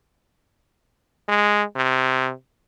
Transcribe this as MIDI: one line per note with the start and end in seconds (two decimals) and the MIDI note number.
1.29 1.63 56
1.76 2.32 48